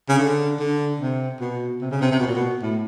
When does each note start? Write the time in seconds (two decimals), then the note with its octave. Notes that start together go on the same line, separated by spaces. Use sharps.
0.09 C#3
0.19 D3
0.59 D3
1.00 C3
1.40 B2
1.81 C3
1.91 C#3
2.01 C3
2.11 C3
2.19 B2
2.27 A#2
2.35 B2
2.62 A2